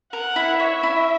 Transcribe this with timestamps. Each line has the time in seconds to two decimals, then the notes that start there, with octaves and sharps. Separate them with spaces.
0.12 A#4 F#5
0.36 E4
0.60 C#5 E5
0.83 E4